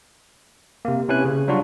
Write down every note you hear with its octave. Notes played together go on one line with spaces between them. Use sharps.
C3 A#3
C3 C#4 E4 B4 G#5 F#6
C#3
F#3 G3 D4 F4 F#4